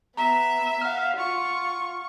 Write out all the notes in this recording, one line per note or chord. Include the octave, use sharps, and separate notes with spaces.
B3 E5 A#5
F5 F#5 F6
F4 C#6